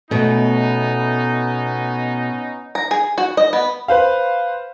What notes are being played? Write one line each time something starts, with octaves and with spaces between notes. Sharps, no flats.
B2 A3 B3 C#4 D#4
A#5
G#4
F#4
D#5
B3
B4 C5 F5